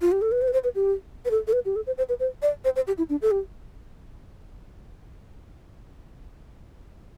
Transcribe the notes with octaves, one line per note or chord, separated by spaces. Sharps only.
F4
G4
A4
B4
C5
B4
C5
B4
G4
B4
A4
A4
B4
G4
A4
C5
C5
B4
C5
D5
C5
C5
G4
E4
D4
A4
G4